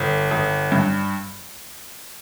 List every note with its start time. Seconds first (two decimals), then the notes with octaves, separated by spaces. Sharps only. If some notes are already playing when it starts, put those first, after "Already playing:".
Already playing: G1
0.31 G1
0.72 G2